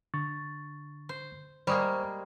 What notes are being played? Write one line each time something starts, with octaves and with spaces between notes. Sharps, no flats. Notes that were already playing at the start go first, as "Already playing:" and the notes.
D3 C#6 A6
C5
G3 G#3 A#3 C5 C#6 D#6